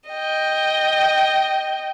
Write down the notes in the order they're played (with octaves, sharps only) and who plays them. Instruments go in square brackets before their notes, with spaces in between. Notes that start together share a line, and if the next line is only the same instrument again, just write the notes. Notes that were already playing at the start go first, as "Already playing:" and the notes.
[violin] D#5 G5